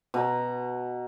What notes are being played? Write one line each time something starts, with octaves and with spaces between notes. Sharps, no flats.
B2 A#5